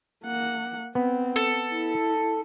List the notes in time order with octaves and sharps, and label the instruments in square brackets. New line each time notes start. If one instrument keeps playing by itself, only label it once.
[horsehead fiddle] A#3 F#5
[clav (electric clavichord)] B3 [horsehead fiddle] C4
[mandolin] A4
[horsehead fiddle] E4